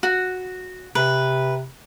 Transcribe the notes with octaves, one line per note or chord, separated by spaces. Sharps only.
F#4
C3 B4